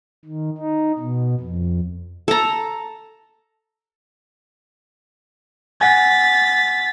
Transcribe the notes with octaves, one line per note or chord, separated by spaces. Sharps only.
D#3
D#4
B2
F2
A4 A#5
F#5 G#5 A6 B6